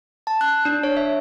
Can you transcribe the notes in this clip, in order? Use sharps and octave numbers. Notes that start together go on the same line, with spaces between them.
A5
F#6
D4
C#5
E5